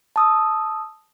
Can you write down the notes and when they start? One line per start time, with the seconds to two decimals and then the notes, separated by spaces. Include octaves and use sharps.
0.16 A5 D#6 E6